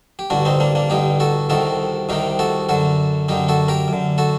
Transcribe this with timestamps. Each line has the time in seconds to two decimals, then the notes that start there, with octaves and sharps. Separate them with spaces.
0.19 G4
0.30 A1 G2 D3 D4 F#4
0.45 C4 D#4
0.60 A#3 D4
0.75 A#3 D4
0.90 A1 G2 D3 D#4 G4
1.20 F#4 A4
1.49 C2 C3 D#3 F#4 A4
2.09 C2 C3 D#3 D#4 G4
2.39 F#4 A4
2.69 F#2 D3 F#4 A4
3.28 F#2 D3 D#4 G4
3.48 F#4 A4
3.68 G4 A#4
3.88 F#2 D3
4.18 F#4 A4